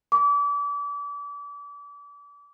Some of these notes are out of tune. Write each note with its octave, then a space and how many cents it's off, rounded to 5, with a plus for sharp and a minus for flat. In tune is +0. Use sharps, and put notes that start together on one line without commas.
D6 -35